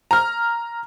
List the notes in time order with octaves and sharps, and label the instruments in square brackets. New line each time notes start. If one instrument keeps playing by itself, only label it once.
[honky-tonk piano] A#5 F6